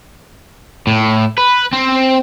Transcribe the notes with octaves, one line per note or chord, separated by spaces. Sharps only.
A2
B4
C4